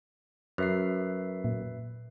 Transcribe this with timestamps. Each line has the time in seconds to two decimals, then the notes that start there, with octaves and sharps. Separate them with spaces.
0.58 F#2 B4 E5 C7
1.44 A#2